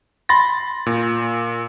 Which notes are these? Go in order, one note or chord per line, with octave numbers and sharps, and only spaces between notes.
B5 C6 A6 A#6
A#2